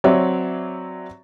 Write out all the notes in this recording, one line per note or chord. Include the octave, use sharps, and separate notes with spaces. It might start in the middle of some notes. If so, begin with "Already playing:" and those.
F#3 C4 C#5 D5 E5